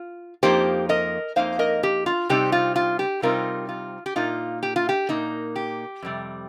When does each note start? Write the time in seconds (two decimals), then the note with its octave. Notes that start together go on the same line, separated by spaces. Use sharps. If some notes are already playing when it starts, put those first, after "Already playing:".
Already playing: F4
0.43 F2 F3 A#3 D#4 G4 C5
0.89 A#4 D#5
1.36 F2 F3 A#3 D#4 C5 F5
1.59 A#4 D#5
1.83 G4
2.06 F4
2.29 C3 G3 C4 D#4 G4
2.52 F4
2.76 F4
2.99 G4
3.22 C3 G3 C4 D#4 F4 A#4
3.69 F4
4.06 G4
4.16 A#2 A#3 D#4 F4
4.63 G4
4.76 F4
4.89 G4
5.09 A#2 A#3 D#4
5.56 G4
6.02 F2 C3 G3